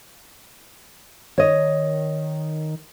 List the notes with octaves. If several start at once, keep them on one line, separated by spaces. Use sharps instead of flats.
D#3 C#5 D#5